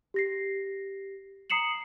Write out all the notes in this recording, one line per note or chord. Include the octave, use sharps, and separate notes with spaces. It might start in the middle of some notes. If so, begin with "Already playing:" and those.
G4 A#6 C7
A#5 D#6 C7 C#7 E7 F#7